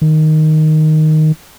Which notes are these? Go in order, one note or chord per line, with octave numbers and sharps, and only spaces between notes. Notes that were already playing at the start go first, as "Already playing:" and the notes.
D#3